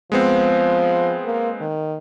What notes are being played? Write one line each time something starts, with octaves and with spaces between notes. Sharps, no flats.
F3 G#3 B3 C4
A#3
D#3